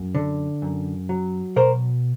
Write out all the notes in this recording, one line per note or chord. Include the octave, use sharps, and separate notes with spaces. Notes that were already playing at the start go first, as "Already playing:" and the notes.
Already playing: F#2
D3
F#2
F#3
B2 A#4 C5